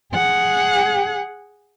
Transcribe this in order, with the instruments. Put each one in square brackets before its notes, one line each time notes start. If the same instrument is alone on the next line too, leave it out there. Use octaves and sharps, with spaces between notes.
[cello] G#4 F#5